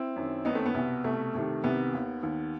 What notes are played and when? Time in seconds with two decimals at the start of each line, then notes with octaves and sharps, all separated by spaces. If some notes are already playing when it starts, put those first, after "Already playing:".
Already playing: C4 E4
0.16 F#2 D#3
0.45 F#2 D#3 B3 D#4
0.55 A3 C4
0.66 B3
0.75 C2 B2
1.04 C2 B2 A3
1.35 C2 C3 D#3
1.64 C2 C3 D#3 B3
1.93 D#2 D#3
2.23 D#2 D#3